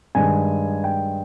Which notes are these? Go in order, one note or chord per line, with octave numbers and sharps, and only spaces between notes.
G2 D#3 G#3 G#5
G5